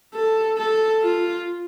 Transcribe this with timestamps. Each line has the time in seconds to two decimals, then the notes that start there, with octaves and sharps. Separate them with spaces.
0.14 A4
0.58 A4
1.03 F4